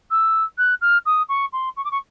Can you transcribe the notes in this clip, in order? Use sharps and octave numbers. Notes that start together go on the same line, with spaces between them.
E6
F#6
F6
D#6
C#6
C6
C#6
D6
C#6